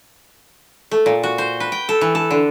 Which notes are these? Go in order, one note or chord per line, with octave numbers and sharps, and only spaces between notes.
A3
A#2
F#4
C5
B4
G5
A4
E3
A4
D3